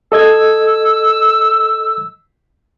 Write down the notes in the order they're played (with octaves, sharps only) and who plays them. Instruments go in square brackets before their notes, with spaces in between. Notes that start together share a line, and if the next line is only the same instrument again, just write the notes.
[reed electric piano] A4 D#5 G#6 [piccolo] E6